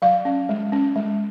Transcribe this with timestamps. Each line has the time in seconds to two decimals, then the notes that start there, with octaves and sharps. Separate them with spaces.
0.02 F#3 F5
0.25 C#4
0.49 G#3
0.72 C#4
0.96 G#3